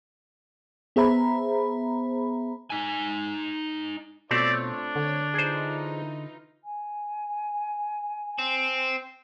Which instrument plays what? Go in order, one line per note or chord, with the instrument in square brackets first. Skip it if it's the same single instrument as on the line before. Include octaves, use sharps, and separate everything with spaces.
[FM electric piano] B3 G#4 C5 E5 A#5 B5
[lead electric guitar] D#4 G#5
[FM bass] B2 [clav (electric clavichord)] A3 C4 [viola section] F4 C#5 [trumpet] D5
[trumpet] D4
[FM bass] D3 [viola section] C#5
[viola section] E3 D#4 F4 [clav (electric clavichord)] G#4 C5
[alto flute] G#5
[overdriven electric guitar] C4